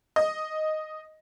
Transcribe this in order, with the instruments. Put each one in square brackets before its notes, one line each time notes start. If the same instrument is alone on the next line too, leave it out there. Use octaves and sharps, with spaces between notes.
[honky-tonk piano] D#5